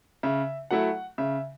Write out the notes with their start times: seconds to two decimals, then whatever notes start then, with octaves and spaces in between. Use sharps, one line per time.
0.23 C#3 E5
0.71 F#3 A3 E4 F#5
1.18 C#3 E5